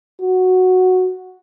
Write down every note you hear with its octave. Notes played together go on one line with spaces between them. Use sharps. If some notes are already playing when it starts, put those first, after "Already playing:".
F#4